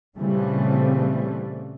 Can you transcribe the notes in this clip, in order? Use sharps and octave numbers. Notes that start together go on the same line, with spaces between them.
A#2 C#3 E3 G3 A3 C4